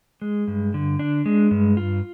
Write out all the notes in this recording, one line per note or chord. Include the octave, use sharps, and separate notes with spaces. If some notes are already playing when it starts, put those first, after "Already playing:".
G#3
G2
D3
D4
G#3
G2
F4